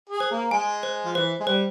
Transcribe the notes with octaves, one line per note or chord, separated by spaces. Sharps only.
G#4
C5
A#3
G#3 G#5
C5
F3
E3 C5
G#3
G3 C5